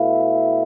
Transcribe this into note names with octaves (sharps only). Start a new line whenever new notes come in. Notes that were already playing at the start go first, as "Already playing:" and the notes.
Already playing: B2 A3 E4 F5